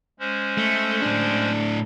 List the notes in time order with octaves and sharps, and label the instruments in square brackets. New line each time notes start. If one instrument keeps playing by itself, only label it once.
[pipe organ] G#3 C#4 C5
[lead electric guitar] A3
A2 D4